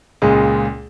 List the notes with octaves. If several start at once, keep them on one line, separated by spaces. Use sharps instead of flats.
C#2 A#2 G#3